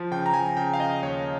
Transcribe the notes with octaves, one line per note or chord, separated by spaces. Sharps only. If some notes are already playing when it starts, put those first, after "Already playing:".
Already playing: F3
C#3 G5
A#5
F3 G#5
C#3 G5
F5
C#3 D#5
D#2 C#5